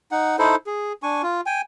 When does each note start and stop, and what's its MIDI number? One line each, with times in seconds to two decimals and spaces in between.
0.11 0.36 63
0.11 0.36 78
0.39 0.56 63
0.39 0.56 64
0.39 0.56 69
0.39 0.56 72
0.66 0.93 68
1.03 1.22 62
1.03 1.22 80
1.03 1.22 85
1.23 1.41 65
1.46 1.61 79
1.46 1.61 80